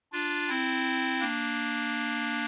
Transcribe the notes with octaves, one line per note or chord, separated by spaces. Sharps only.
D4 F4
C4 E4
A#3 D4